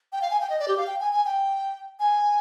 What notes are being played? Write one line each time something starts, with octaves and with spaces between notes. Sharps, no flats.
G5
F5
G#5
G5
D#5
D5
G4
F5
G5
G#5
G#5
G5
G#5